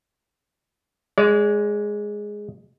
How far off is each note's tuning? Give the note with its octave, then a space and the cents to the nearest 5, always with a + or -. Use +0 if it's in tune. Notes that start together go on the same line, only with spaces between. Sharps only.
G#3 +0 D5 -40